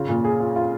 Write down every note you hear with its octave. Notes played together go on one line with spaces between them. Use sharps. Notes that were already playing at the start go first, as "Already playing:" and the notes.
Already playing: C#3 F4
A#2
G#4
F4
F4